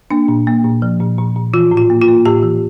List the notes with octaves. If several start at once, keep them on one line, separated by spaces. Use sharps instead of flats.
A#3 D4
A#2
A#3
A#2
F3
A#2
A#2
A#2
E3 F4
A2
F4
A#3
F4
A#3
A2 G4
E3